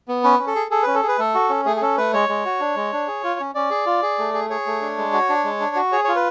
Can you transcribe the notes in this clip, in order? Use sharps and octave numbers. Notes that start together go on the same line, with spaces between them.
B3
C#4 B4
C#4
A4
G#4
G#4 A4
C#4 B4
A4
G#4
B4
A3 A4
F#4
C#4
A3 G#4
G#4
C#4 A4
A3 B4
G#3 C#5
G#3
F#4
D4
G#3
D4
G#4
F4
C#4
C#4 D5
G#4
F4
G#4
A3
G#4
G#4 C#5
A3
D4
G#3
F#4
D4
G#3
D4
F#4
G#4 C#5
F4 C#5
B4